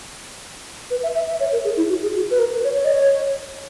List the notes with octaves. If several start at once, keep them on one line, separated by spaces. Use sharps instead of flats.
B4
E5
E5
E5
C#5
A#4
G#4
E4
F#4
G#4
F#4
B4
A#4
B4
C#5
C#5
D#5
C#5